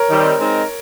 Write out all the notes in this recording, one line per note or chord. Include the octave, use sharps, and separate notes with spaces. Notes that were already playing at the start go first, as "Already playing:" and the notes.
Already playing: A#4 C#5
D#3 G3 C4
G#3 C4 D#4 A#4